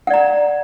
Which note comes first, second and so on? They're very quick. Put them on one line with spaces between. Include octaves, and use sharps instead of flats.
F#5 D5 A#5